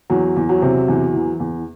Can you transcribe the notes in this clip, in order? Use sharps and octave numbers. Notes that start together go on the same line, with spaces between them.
E2 F#3
E2
F#3
C3
E2
E3
E2